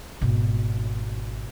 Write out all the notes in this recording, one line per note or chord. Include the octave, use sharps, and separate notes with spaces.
G#1 B2